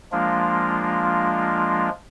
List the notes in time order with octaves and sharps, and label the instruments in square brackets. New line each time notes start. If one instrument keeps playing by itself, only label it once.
[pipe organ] F3 G#3 A#3 D4 F4